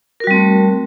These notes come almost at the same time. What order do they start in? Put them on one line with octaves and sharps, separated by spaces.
A#4 F#4 G3 C4 A3